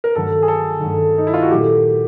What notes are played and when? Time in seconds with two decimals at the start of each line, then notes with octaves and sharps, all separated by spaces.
0.04 A#4
0.15 G2 D#3 F#3 A3 A4
0.43 G#4
0.48 A4
0.80 G2 D#3 F#3 A3
1.18 D#4
1.27 E4
1.34 F4
1.42 F#4
1.51 A#2 F#3 A3 G4